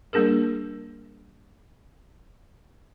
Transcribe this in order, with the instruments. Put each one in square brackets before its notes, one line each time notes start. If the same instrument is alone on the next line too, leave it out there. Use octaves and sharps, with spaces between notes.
[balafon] G3 A#3 D4 G#4 A#4